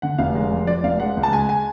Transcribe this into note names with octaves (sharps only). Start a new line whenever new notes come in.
D3 F#5
F1 F5
G#3
F2
F3 D5
F1 F5
G#3 F#5
C#2
A5
G#3 G#5
G#5